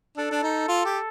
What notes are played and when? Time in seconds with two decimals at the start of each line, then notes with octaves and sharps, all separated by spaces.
0.17 D4 A4
0.31 D4
0.43 D#4
0.69 F4
0.86 G4